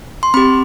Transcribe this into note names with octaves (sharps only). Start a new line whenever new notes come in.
C6
C4 G4 B5